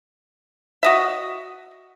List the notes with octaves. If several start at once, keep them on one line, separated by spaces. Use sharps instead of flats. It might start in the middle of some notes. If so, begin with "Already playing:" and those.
F#4 D#5 E5